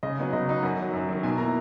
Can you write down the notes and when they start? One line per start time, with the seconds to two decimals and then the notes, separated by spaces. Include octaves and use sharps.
0.03 C#3 D#5
0.18 F#3 B3 D#4
0.33 C#3 D#5
0.48 F#3 B3 D#4
0.63 F#2 F#5
0.78 D#3 F#3
0.93 F#2
1.09 D#3 F#3
1.23 B2 G#5
1.38 A#3 E4 A#5